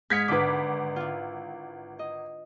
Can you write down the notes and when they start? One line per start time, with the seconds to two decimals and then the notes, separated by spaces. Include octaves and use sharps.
0.10 G#2 D#5 F6 G#6 B6 C#7
0.28 G#1 D3 D4 B4 D6
0.96 E4 F4
1.99 D#5